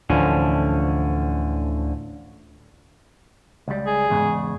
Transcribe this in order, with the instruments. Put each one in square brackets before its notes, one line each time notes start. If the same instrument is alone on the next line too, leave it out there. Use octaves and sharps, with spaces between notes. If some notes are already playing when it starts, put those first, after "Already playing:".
[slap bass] D2 A2 E3 [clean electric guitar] D3 F3 C#4
[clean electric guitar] C#2 G3
[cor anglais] G#4
[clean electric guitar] E2 G#2 C#3